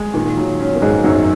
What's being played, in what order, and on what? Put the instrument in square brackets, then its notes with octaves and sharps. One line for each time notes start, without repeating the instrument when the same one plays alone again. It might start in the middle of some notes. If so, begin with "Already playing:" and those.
Already playing: [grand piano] G#3
[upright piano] A#2 A#3 [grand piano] D#3
[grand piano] F#3
C#4
[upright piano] A#3
[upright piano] G#2 G#3 [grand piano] G#4
[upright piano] F#2 F#3 [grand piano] D#3